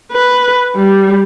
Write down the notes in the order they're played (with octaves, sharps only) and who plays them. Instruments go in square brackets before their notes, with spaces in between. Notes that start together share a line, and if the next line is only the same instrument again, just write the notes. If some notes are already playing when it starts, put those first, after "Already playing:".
[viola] B4
G3